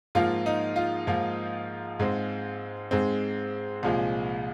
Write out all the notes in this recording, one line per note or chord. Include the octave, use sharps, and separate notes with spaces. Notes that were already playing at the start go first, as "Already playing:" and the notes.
G#2 F3 A#3 F4
D#4
F4
G#2 F3 A#3
G#2 G#3 C4
G#2 G#3 C4
C2 A#2 F3 G#3